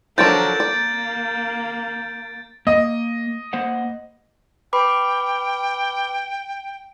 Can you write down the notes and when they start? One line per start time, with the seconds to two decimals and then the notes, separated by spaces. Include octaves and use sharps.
0.18 F3 F#3 D4 A4 A#4 G6 A6 D7
0.60 A#3 D5
2.67 A#3 D#5
3.53 A#3 C5 F#5
4.73 B4 G5 B5 D6